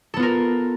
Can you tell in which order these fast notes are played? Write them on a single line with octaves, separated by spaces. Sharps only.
A4 B3 F4 A#4